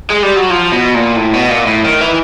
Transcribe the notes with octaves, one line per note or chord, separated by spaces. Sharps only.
G#3
G3
F#3
F3
B2
A#2
A2
B2
A#2
A2
D#3
E3